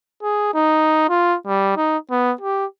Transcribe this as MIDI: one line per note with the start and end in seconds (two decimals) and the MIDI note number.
0.23 0.49 68
0.54 1.07 63
1.09 1.36 65
1.47 1.73 55
1.77 1.97 63
2.11 2.33 59
2.41 2.66 67